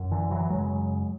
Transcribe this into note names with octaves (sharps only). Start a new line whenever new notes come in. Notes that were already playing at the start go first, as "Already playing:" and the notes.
Already playing: F#2
D3 E3
E3 F#3
F#2 C#3 F#3 G#3